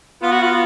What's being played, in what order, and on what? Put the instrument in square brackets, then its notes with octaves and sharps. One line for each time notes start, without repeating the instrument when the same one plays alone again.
[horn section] B3 [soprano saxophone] F4
[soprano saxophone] F#4
F4